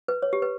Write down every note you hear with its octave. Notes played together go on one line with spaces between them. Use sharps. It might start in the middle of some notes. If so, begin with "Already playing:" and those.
B4
C#5
G4
B4